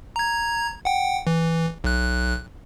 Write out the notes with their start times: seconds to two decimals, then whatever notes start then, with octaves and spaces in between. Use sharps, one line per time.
0.16 A#5 G#6
0.85 F#5 G5
1.27 E3
1.84 B1 F#6